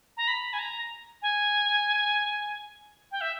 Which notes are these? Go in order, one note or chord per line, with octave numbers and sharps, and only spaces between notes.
A#5
B5
G#5
A#5
G#5
G5
E5